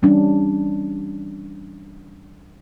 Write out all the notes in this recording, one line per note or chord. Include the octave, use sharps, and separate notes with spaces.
E3 G3 C#4 D4